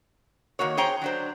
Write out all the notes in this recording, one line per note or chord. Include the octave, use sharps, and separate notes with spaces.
D#3 F3 A#3 F#4 C#5
G#4 C5 C#5 G5 A#5
F#3 D4 C5